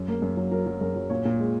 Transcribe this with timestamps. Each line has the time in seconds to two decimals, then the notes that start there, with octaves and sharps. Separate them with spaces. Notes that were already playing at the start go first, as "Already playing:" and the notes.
Already playing: F#2
0.08 A#3
0.22 F#2
0.37 F#3
0.51 F#3 A#4
0.66 F#3
0.81 F#2 A#4
0.96 F#3
1.10 A#2 C#5
1.25 A#2
1.39 G#3